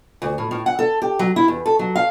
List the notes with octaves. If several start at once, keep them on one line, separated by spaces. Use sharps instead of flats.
D2
A2
A2
F#5
A4
G4
F#3
E4
E2
A4
F#3
F5